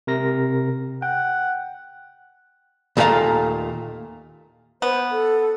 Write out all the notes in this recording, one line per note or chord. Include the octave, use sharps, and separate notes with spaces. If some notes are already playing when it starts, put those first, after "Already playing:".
C3 A#4 A#6
F#5 G5
D#2 A#2 A3 C4 F5 A#5
B3 C5
A4